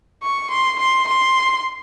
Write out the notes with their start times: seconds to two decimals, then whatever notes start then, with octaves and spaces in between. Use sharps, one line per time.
0.23 C#6
0.51 C6
0.79 C6
1.08 C6